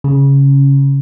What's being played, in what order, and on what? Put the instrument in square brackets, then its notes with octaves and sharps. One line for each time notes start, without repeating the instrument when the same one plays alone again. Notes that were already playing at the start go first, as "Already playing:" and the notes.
[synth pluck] C#3